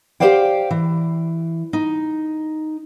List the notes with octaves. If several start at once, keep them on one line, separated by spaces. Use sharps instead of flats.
G4 A#4 C5 D5 F5 G5
E3
D#4